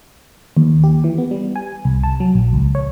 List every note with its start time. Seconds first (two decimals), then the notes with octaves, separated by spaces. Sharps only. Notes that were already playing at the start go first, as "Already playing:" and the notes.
0.57 D#2
0.84 G4
1.04 E3
1.18 B3
1.31 G3
1.56 G#5
1.85 C2
2.04 A5
2.20 F#3
2.35 A#1
2.53 C#2
2.75 C#5